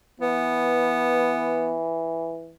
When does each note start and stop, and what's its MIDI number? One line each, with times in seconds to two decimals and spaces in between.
0.20 2.54 52
0.20 1.78 59